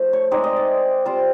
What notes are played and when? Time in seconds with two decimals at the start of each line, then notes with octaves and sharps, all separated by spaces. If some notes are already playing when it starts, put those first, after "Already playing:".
Already playing: F3 A3
0.13 C#5
0.31 G#3 C4 D#4 D5
0.44 D#5
0.56 D5
1.05 G3 C4 F4 C5